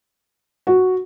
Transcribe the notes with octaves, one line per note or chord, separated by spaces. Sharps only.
F#4